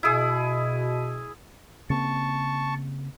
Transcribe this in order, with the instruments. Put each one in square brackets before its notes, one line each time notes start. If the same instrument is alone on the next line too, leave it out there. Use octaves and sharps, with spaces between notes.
[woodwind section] B2 [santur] E4 G#4
[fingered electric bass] C#3 A#3 C4 [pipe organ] A5 C#6